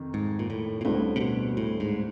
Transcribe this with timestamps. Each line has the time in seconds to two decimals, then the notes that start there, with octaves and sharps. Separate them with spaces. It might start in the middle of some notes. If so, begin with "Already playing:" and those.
Already playing: F2 C3 D#3
0.14 G#2
0.39 A#2
0.50 A2
0.81 A#2
0.85 D2 A2 D3 G3 C4
1.16 C3
1.21 B2
1.57 A2
1.80 G#2